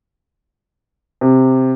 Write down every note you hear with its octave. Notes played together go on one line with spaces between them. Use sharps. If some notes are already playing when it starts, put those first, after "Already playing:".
C3